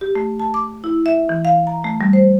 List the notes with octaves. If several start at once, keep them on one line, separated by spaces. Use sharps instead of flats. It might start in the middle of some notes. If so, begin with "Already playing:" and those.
G4
A3
A5
D6
E4
E5
E3
F5
A#5
A3
G3
C5